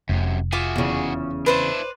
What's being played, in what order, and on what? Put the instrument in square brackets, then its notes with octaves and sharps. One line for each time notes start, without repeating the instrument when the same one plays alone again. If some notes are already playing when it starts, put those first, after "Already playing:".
[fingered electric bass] F1 [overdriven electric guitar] F#2 C3
[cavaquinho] F4 E5 D6 [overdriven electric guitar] F#4 G#4
[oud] E2 C#3
[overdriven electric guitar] D4 E4 [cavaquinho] B4 C5 D5